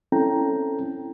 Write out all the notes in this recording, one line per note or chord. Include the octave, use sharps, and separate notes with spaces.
C4 C#4 E4 A4 G5 A#5